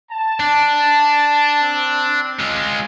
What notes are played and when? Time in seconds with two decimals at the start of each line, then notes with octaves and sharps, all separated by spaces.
0.12 A5
0.40 D4
1.61 C4
2.40 G#3 F4